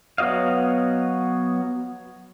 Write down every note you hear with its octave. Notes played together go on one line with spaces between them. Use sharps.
F#3 B3 F#4 D#5 F5